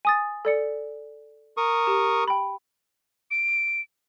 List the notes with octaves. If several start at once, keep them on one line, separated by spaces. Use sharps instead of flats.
G#5 D#6 A6
A4 D5 C#7
A#4 C#6 D#6
G4
G5 B5
D7